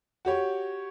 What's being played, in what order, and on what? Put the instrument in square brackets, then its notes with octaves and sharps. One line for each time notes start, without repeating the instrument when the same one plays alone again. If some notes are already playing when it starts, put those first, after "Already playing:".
[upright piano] F#4 G4 C#5